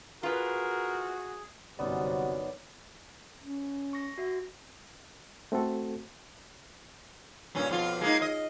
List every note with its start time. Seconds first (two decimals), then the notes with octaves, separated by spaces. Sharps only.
0.23 F4 F#4 G#4 A#4 B4
1.79 G1 F#2 C3 B3 C#4 D#4 F#4 D5
3.43 C#4
3.93 C#6 A#6
4.18 F#4 E5
5.52 A3 C4 F#4 A4
7.55 G2 A#2 C#4
7.70 F2 B2 F4
8.01 G#3 A#3 D#4
8.22 D#5